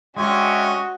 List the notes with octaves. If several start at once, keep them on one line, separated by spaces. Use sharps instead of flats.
G#3 C#4 D4 F#4 D#5 E5 G5 G#5